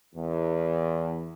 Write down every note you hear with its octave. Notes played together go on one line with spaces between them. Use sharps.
E2